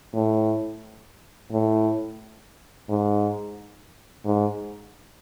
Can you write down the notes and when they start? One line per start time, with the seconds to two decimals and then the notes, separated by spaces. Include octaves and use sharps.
0.15 A2
1.52 A2
2.89 G#2
4.25 G#2